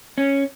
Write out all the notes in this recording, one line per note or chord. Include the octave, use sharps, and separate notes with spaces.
C#4